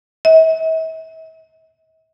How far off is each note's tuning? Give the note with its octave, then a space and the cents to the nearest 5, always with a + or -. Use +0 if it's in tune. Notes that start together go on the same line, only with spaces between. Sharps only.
E5 -40